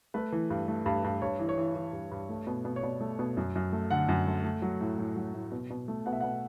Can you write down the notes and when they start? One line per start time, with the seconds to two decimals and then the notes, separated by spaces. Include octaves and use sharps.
0.14 A3 B4
0.32 E3
0.50 G2
0.68 A3
0.86 G2
1.04 G2
1.22 G2 C#5
1.39 E3
1.49 C#5
1.58 E3
1.75 E3
1.93 G2
2.11 G2
2.29 A3
2.47 B2
2.65 B2
2.76 C#5
2.83 B2 D5
3.01 A3
3.19 B2
3.37 F#2
3.55 F#2
3.73 A3
3.91 D3 F#5
4.09 F#2
4.27 A3
4.44 A3
4.62 F#3
4.81 A2
4.98 A2
5.16 F#3
5.34 A2
5.52 B2
5.70 B2
5.88 A3
6.06 B2 F#5
6.13 E5
6.20 B2 F#5